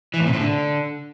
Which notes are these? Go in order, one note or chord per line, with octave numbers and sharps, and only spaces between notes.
E3
A2
C3
A2
D3